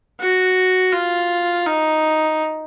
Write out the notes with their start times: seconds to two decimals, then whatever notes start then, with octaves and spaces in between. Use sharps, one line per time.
0.20 F#4
0.93 F4
1.67 D#4